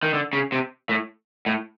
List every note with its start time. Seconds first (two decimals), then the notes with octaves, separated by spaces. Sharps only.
0.03 D#3
0.14 D3
0.33 C#3
0.52 C3
0.89 A2
1.46 A2